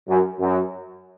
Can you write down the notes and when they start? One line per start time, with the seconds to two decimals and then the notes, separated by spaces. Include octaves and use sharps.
0.09 F#2
0.40 F#2